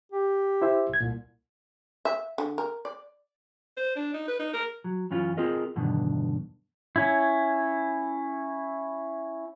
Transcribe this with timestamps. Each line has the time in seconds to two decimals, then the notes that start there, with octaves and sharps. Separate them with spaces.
0.12 G4
0.62 E4 C5 E5
0.89 C2 G#6
1.01 C2 A#2
2.05 E5
2.38 D3
2.58 A#4
2.85 D5
3.77 C5
3.95 D4
4.14 D#4
4.28 B4
4.40 D#4
4.54 A#4
4.84 F#3
5.11 F#2 E3 C#4 F4
5.37 C4 F4 G#4 A#4 D#5
5.76 E2 G2 B2 D3 D#3
6.96 C#4 E4